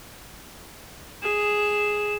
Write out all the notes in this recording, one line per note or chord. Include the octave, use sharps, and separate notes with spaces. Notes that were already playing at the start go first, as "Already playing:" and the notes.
G#4 E7